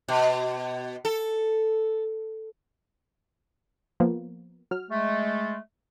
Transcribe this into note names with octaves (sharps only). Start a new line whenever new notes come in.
B2
A4
F3 A#3 B3
F#3 F6
G#3 A3